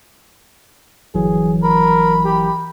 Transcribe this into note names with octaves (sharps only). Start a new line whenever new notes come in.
G1 E3 F#3 G#4
A#4 B5
G4